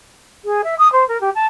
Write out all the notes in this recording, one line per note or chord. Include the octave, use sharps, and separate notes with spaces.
G#4
E5
D#6
C5
A#4
G4
A5